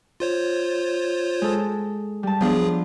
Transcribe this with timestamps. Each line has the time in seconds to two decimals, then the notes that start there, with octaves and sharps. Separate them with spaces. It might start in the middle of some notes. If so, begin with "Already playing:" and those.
0.20 F4 C5 C#5
1.42 G#3 A4
2.23 G3 A5
2.41 F3 F#3 B3 D4 G#4